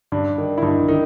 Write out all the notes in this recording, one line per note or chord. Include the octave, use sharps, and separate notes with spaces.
G2 D4
D#3
E4
G2 D#4
D#3 D#4